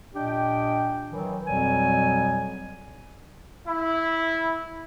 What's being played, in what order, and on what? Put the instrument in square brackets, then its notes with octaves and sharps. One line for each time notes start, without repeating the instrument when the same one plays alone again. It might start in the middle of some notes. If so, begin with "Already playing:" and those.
[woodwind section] A#2 D4 G4 D#5 G5
D#3 E3 F#3
F2 B2 F#3 G3 G#5
[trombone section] E4